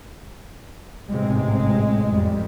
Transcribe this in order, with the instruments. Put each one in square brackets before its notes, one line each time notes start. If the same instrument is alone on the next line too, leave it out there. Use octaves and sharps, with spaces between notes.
[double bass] A1 G#3 [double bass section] G#2 C3 C4
[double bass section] F2 G3